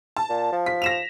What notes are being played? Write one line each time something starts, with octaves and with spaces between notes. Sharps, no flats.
A5
A#2
F3
B6
A#6 E7 F7